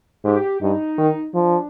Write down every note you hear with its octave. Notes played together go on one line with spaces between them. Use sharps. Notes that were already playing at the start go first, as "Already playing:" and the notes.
G#2 G4
G2 D#4
D#3
F3 D4